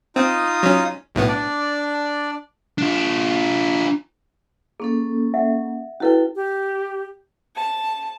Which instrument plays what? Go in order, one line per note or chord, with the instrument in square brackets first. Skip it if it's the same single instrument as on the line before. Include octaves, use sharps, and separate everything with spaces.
[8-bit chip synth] C4 [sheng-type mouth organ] D#4 F4 D#6
[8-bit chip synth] F#3 C#4
B1 A2 B3
[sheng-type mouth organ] D4 D5
[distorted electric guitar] D4 F4
[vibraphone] A#3 C#4 A4 [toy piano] G#4
[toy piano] E5 F#5
[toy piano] C#4 E4 B4 [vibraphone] F#4 A4 G5
[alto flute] G4
[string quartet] A5